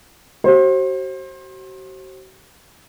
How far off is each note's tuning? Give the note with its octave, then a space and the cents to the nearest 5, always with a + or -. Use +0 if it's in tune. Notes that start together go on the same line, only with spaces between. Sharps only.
F#4 +40 C5 +30